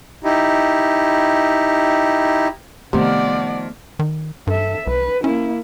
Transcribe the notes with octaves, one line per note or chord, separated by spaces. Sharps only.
D#4 E4 G4
C3 D#3 F3 A3 B3 D5 F#5
D#3
G2 A4 E5
C2 B4
A#3 C#4 E4